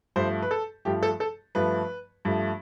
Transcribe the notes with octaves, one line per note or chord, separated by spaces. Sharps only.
G2 F3 A3 C5
B4
A4
G2 F3 A3 G4
A4
A4
G2 F3 A3 B4
G2 F3 A3